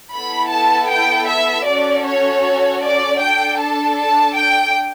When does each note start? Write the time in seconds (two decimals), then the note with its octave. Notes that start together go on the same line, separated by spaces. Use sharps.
0.14 B3 E4 A4 B5
0.52 A5
0.91 G5
1.29 E5
1.68 C#4 F#4 A4 D5
2.07 C#5
2.84 D5
3.22 D4 A4 G5
3.60 A5
3.99 A5
4.37 G5